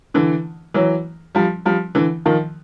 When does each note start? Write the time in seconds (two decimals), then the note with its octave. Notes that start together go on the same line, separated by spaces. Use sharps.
0.14 D3 E3
0.74 E3 F#3
1.35 F3 G3
1.65 F3 G3
1.95 D3 E3
2.26 D#3 F3